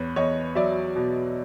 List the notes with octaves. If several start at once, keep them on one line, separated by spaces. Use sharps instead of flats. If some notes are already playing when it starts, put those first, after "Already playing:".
Already playing: E2 B4 C#5
E2 C#5 D#5
F#3 D5 E5
B2